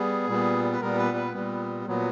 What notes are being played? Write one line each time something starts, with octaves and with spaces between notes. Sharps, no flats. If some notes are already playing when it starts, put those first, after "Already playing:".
Already playing: G3 B3 G#4
A#2 G3 B3
B4
A#2 G3 B3 A#4
B4
B4
A#2 G3 B3
A#2 F#3 B3